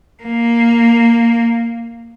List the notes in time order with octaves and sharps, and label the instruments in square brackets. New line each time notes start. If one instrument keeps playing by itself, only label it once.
[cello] A#3